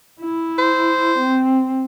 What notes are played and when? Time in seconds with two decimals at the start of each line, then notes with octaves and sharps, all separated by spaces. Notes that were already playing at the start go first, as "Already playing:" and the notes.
0.21 E4
0.58 C5
1.19 C4